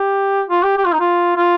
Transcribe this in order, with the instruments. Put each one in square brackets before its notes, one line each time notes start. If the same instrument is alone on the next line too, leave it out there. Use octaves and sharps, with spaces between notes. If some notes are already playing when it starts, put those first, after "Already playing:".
Already playing: [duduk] G4
F4
G4
G4
F4
D#4
F4
F4